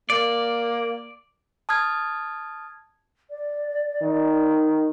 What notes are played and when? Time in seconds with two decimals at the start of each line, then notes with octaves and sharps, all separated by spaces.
0.10 A#3 D5
1.69 A5 D#6 F6 G#6
3.30 D5
4.02 D#3